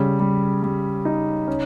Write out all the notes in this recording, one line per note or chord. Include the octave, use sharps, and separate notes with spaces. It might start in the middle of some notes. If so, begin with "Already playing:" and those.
Already playing: C#3 G3 C#4
G3
G3
D#4
C#4